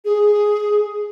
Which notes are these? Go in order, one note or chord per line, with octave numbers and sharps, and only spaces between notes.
G#4